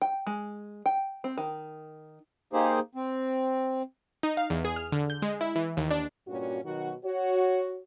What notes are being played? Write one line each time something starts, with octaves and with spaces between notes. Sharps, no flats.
G5
G#3
G5
C4
D#3
A#3 D#4 G4 G#4 C5
C4
D#4
F5
E2
G#4
F6
D3
G6
G#3
E4
E3
D#2
D4
G2 A#2 G3 C#4 F#4
B2 D#3 F#3 F#4
F#4 C#5